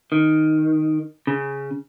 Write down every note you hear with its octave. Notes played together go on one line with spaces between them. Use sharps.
D#3
C#3